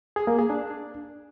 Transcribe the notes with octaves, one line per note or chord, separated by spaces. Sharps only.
G#4
A#3
G#4
D4